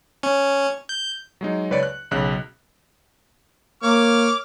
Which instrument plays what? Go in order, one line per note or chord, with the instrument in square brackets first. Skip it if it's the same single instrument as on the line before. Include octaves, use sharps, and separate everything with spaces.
[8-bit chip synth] C#4
G6
[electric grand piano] F#3 G#3 D#4
C#2 B4 C#5 D5 C#7
F#6
B1 C#3 F#6
[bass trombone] A#3 [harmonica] C#5 D6 F6